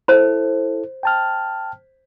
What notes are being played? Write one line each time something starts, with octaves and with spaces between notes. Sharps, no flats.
E4 A4 C5 B5
G5 A5 F6